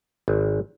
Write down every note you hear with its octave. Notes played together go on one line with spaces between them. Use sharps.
G#1